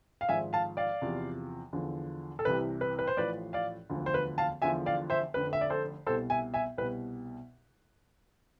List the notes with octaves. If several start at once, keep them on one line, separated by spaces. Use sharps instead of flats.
F5
G#1 G#2 F3 E5 G#5
F5 A5
D5 F5
E2 C3 F3
E2 D3 F3
A4
C2 C3 E3 B4
B4
B4
C5
A1 A2 F3 B4 D5
D5 F5
E1 D2 D3 F3
C5
B4
F5 A5
E1 E2 D3 F3 E5 G#5
D5 F5
C5 E5
F1 F2 D3 B4
E5
D5
A4 C5
C2 B2 A4 C5
E5 G#5
E5 G#5
C2 B2 B4